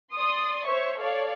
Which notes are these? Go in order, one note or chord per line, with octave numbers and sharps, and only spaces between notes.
D5 C6 D#6
C5 C#5 E5 C#6
A4 C#5 D5 F5